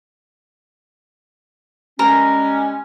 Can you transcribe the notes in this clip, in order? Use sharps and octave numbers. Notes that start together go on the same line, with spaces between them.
G3 G#3 C#4 A#4